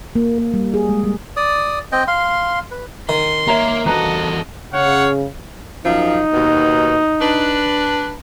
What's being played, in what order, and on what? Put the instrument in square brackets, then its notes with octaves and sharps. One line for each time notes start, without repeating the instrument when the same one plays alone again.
[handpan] A#3
A#3
G3
G#4
G#3
G3
[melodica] D5 D#6
C4 D#5 G5
F5 C6
B4
[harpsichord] D#3 [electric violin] C6
[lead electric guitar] A#3 [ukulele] C#5 E5 A#5
[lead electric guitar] E2 A4 [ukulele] D4 B4 A#5 [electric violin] F#4 D#5
[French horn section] C#3 [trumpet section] C#5 F5 F#5
[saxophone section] F#2 F3 [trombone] D#4
[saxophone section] D#2 B2
D4 B4